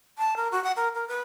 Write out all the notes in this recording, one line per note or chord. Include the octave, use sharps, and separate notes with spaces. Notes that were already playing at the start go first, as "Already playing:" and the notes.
A5
A#4
F#4
F#5
A#4
A#4
B4